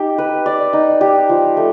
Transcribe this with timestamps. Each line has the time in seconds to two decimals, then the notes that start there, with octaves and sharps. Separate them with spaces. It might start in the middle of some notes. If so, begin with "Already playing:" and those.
Already playing: D#4 G4
0.18 B4
0.46 D5
0.73 D#4
1.01 G4
1.29 F3
1.57 A3